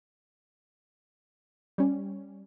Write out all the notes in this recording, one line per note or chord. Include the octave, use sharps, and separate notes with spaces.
G3 C#4